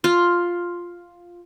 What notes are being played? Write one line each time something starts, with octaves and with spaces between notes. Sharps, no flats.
F4